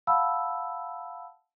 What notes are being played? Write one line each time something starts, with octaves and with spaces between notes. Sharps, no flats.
F5 F#5 A5 B5 E6